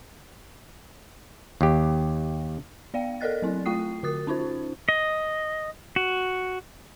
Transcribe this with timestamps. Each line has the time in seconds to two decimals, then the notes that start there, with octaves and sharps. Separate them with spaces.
1.61 D#2 G4
2.94 B3 D5 F5 G5
3.21 A4 A#4 D5 D#5 F#6 A6
3.42 F#3 C4 E4
3.66 A3 F4 G5 D#6 C7
4.03 D3 F#4 A#4 D#6 A6
4.27 C#4 D#4 F4 C5
4.89 D#5
5.96 F#4